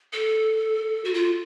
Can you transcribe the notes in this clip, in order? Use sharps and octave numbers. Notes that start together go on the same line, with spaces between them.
A4
F#4
F4